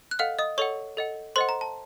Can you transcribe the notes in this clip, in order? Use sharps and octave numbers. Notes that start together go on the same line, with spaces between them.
F#6
A4 D#5 F5 F#5 F6
D#5 D#6
A4 C#5 D#5 F#5 C#6
A4 D#5 F#5
A4 C5 D#5 F#5 C6
A#5
A5